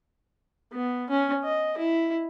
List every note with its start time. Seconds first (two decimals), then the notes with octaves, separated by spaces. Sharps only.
0.73 B3
1.10 C#4
1.44 D#5
1.78 E4